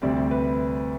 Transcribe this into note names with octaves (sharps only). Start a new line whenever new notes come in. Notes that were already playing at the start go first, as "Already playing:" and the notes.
D2 C3 G3 C4 D5
B4